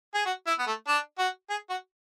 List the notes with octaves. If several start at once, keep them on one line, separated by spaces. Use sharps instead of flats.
G#4
F#4
E4
B3
A3
D4
F#4
G#4
F#4